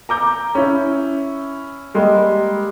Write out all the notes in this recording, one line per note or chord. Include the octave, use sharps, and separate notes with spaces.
A#5 D6 G6
C#4 E4
G3 G#3 A#3